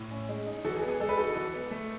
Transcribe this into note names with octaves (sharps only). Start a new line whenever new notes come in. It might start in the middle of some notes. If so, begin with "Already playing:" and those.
Already playing: A2
C#4
G#3
D#4
E3 F#4 A4
G#4
B3
G#4
G#3 A4
B4
D#4 F#4 A4
E3
B3
A3